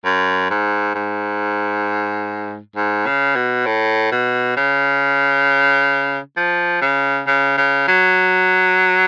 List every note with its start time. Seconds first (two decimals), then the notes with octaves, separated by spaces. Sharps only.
0.05 F#2
0.50 G#2
0.95 G#2
2.76 G#2
3.06 C#3
3.36 B2
3.66 A2
4.12 B2
4.57 C#3
6.37 F3
6.81 C#3
7.27 C#3
7.57 C#3
7.88 F#3